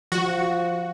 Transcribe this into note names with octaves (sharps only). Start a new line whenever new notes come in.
F3 F#4